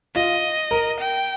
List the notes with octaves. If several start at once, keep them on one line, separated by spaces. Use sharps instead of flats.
F4 D#5
A#4
G5